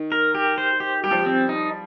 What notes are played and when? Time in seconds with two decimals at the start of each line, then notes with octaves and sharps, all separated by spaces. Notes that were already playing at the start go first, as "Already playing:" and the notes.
Already playing: D#3
0.12 A#4
0.35 G4
0.58 C5
0.80 G4
1.04 G3 G4
1.11 F3
1.19 G3
1.26 C4
1.49 D#4